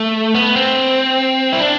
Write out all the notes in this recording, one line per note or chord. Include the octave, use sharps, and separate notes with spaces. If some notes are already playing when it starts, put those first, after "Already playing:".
Already playing: A3
B3
C4
E4
D4